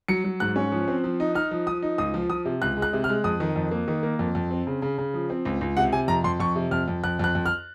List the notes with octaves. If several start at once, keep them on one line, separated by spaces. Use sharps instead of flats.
F#3 C#7
F#3
G#2 F#6
C#4
F3
C4
F3
D#4
D#4 F6
F3
F3 D#6
D#4
C#2 D#6
F3
F3 D#6
C3
C#2 F#6
G#3
F#6
C3
F6
G#3
F2 D#6
D#3
F2
A#3
D#3
A#3
F2
F2
C4
C#3
C#3
C#3
F3
C4
C#2
C#2
C3 F#5
C3 G#5
F2 A#5
F2 C6
F2 C#6
C3
F2 F6
F2
F2 F#6
F2 F#6
F2
F6